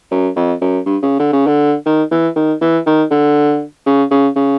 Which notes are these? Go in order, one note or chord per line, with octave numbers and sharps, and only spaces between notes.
F#2
F2
F#2
G2
C#3
D3
C#3
D3
D#3
E3
D#3
E3
D#3
D3
C#3
C#3
C#3